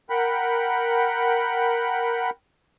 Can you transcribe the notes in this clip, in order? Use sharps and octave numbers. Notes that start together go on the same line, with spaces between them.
A#4 F#5 G5 B5